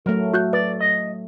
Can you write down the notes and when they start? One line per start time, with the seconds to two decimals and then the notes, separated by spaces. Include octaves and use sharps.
0.06 F#3 A3 A#4
0.34 F#4 F#6 G6
0.53 B4 D5
0.81 D#5